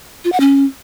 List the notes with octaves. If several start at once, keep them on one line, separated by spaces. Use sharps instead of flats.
F4
F#5
C#4